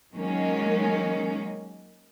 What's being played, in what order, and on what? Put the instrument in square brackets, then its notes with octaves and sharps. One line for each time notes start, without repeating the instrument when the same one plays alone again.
[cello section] D#3 F#3 G#3 A#3 C#4 D#4